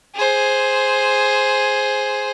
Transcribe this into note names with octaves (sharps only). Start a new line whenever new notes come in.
G#4 C5